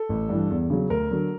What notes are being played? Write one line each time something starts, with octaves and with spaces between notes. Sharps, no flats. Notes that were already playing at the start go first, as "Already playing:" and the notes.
Already playing: A4
A1
G2 E3
E2
C#3 F#3
D2 A#4
D3 F#3